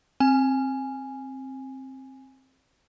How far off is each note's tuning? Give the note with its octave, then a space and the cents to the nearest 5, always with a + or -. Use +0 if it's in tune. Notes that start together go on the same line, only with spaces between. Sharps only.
C4 +15 G#5 +0